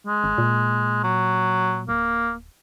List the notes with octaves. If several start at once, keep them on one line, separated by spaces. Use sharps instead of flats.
G#3
G#1
A#2
F#3
D1 A#3